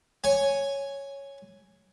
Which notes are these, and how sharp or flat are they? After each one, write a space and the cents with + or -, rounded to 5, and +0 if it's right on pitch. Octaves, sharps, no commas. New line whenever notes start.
C#5 +0 G#5 +0